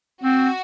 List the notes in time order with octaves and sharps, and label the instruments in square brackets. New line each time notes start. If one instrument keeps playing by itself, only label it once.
[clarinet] C4 [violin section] F#4